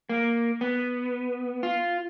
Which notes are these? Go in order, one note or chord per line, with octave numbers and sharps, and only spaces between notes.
A#3
B3
F4